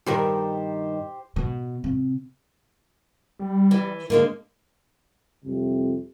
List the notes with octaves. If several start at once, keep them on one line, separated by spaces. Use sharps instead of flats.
G2 D#3 G4 A#4 C5
B2
C3
G3
E3
G#2 D3 G#3 A#3
C2 F2 C3